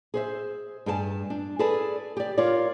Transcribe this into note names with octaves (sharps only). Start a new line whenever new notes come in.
G#4 C5 E5
G2 G#4 G5 A5
D4
G#4 A4 B4 D5 A5
G4 D5
F4 A#4 C#5 D5